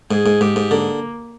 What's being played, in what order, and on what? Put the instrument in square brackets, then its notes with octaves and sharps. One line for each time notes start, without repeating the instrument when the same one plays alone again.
[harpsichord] G#2 [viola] G#4
[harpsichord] G#2
[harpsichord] G#2 [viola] G4
[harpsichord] G#2
[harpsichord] D3 [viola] A#3